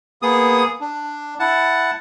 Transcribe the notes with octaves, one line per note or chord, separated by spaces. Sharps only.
A#3 B3 G#4 D#6
D4
E4 F#5 A5